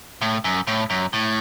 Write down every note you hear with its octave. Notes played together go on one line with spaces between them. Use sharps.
A2
F#2
A2
F#2
A2